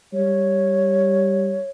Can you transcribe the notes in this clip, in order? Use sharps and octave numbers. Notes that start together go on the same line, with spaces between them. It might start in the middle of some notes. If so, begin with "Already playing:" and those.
G3 C#5